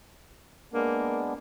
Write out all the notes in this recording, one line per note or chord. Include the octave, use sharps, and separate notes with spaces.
G#3 A#3 B3 D4